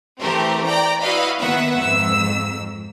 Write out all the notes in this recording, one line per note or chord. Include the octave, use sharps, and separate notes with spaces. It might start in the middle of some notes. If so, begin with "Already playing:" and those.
E3 A3 C4 G4 A#4
D5 G5 A#5 D6
E4 F#4 B4 D#5 F5 B5
D#3 B3 B4 E5 F#5
F2 G#2 E6